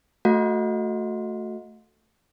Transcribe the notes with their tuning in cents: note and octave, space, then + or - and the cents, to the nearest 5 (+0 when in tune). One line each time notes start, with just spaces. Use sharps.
A3 +0 F#4 -15 F5 +45